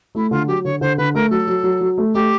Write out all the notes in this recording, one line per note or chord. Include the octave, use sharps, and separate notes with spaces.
A3 E4
D3 F4
F#3 G4
D3 C#5
D3 C5
D3 B4
A3 A#4
F#3 A4
F#3
F#3
F#3
A3
A3 G4